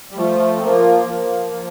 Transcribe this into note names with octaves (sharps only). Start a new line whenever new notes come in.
G3
F3 A3
C4
F3 A#3
F3
F3